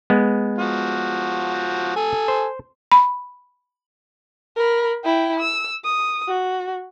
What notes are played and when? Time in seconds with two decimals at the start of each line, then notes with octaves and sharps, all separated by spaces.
0.10 G#3 B3
0.59 F3 F#4
1.96 A4 G#5
2.28 C5
2.92 B5
4.57 A#4 B5
5.05 E4 G5
5.39 E6
5.85 D#6
6.29 F#4